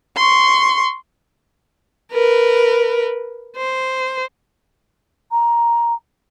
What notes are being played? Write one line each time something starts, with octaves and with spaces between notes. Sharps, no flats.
C6 C#6
A#4 B4
C5
A#5